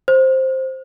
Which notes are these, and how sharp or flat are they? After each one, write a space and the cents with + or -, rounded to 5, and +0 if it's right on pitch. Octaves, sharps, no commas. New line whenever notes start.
C5 +10